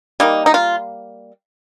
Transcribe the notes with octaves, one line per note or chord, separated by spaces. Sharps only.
G3 A#3 D#4
D#4
F4